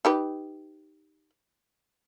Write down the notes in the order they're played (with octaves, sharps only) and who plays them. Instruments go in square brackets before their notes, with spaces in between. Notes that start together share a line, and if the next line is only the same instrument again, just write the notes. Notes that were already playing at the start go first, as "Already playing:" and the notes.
[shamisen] D#4 G4 B4